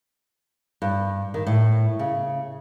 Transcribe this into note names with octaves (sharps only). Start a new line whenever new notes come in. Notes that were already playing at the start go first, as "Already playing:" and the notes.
G2
D#3
A2
C#3